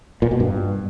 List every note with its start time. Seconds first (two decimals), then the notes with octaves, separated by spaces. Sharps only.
0.22 A#2
0.31 B2
0.40 G2